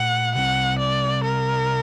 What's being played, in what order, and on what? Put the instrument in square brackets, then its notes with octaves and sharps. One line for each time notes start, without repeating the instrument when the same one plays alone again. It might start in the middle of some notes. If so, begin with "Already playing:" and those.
Already playing: [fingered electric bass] A#2 A3 [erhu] F#5
[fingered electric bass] C3 G3 C4 [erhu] F#5
[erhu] D5
A#4